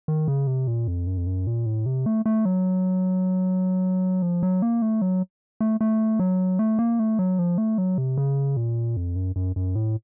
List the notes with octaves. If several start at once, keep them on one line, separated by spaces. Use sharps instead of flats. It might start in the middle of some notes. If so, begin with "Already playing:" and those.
D#3
C#3
C3
A#2
F2
F#2
F2
F#2
A#2
A2
C3
A3
A3
F#3
F3
F#3
A#3
A3
F#3
A3
A3
F#3
A3
A#3
A3
F#3
F3
A3
F#3
C3
C#3
A#2
F2
F#2
F#2
F#2
A2